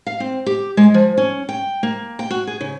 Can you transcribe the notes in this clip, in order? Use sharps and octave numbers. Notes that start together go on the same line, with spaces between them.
F5
C4
G4
G#3
F3
C#4
G5
A#3
G5
F#4
G#4
C#3